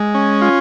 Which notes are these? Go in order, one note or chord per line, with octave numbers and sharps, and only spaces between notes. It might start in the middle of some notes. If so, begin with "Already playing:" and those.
Already playing: G#3
C#4
F4